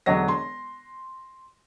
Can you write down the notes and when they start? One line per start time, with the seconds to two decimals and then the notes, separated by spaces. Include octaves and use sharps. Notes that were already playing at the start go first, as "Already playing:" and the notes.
0.06 E1 D3 F#3 C#5 D#5 A#6
0.28 C6